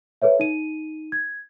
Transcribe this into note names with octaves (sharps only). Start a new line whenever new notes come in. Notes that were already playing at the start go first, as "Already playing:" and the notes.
A4 B4 C#5 E5
D#4 D#7
G#6